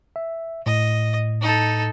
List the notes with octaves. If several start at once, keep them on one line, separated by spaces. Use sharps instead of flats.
E5
A2 D#5
D#4 A4